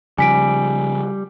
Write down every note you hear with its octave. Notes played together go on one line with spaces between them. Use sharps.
C#3 F3 G3 G#5 B6 D7